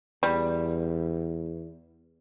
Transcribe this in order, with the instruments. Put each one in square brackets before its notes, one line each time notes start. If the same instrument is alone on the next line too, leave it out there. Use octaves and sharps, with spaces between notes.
[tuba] E2 [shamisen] G3